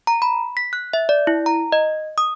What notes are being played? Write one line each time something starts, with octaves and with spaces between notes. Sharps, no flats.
A#5
B5
B6
F#6
E5
D5
E4
A#5
D#5
D#6